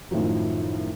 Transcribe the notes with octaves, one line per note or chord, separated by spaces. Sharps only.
F#2 A2 D#3 F3 F#3